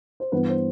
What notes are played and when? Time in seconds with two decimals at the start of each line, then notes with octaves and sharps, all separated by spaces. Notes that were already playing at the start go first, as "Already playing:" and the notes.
0.20 C5
0.32 G2 E3 B3 B4
0.49 C5